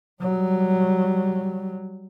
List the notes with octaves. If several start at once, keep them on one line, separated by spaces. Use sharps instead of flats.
F#3 G3